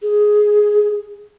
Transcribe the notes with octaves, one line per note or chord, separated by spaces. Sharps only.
G#4